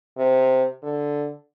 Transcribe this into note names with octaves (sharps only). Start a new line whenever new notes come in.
C3
D3